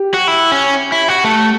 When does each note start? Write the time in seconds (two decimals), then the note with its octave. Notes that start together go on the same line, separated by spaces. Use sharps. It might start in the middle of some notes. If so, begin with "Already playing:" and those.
Already playing: G4
0.14 F#4
0.28 E4
0.52 C#4
0.92 E4
1.08 F#4
1.24 A3